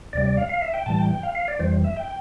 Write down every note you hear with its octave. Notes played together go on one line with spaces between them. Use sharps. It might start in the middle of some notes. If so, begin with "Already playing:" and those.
D2 C3 G3 D5
D5
F5
F5
E5
G5
A2 E3 G3 A5
G5
G5
F5
F5
D5
F2 E3 G3 C5
E5
G5